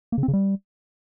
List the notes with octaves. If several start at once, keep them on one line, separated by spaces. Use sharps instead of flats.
A#3
C#3
C4
C#3
G3